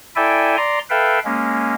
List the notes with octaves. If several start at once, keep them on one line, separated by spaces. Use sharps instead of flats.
E4 A4 D5 E5 G5 G#5
D5 A#5 C6
A4 B4 E5 F5 G5
G#3 A#3 C#4